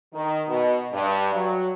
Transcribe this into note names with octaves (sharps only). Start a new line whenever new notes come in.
D#3
B2
G2
F#3